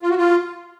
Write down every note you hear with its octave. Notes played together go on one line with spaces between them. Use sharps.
F4
F#4
F4